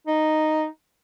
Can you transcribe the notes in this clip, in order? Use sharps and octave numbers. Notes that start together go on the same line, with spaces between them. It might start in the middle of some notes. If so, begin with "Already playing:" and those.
D#4